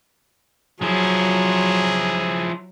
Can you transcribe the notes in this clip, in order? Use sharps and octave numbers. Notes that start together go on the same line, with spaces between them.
F3 F#3 E4 G#4